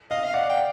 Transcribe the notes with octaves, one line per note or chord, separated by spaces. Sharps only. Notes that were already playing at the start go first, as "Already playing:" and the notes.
D#5 F5
F5
D5 F#5
G5